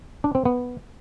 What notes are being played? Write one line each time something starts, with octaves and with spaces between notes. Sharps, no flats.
D4
C4
B3